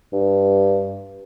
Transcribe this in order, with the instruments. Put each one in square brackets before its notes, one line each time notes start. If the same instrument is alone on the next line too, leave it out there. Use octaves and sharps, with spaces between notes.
[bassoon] G2